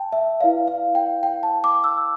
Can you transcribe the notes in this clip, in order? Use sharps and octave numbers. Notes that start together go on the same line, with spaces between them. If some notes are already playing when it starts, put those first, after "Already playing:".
Already playing: G5 A5
E5
E4 B4 D5 F5
F5
G5
G5
A5
D6
E6